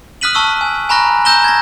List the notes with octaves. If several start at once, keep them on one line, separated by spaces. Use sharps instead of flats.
D#6 F6 F#6 B6 D#7 F#7
A5 C#6 E6
G#5
G#5 A#5 B5 C#6 F#6 A#6
A#5 E6 G6 A#6 E7 G7
G#6 A#6